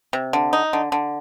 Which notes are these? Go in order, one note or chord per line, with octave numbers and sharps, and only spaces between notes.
C3
D3
D#4
D3
D3